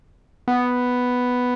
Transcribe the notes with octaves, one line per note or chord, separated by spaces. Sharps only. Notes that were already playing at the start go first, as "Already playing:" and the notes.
B3